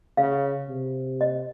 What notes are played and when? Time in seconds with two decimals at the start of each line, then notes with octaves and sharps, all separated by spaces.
0.17 C#3 F5
0.69 C3
1.21 D#5